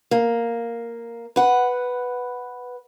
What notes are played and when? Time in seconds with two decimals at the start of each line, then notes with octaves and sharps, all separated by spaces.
0.11 A#3
1.36 B4 F#5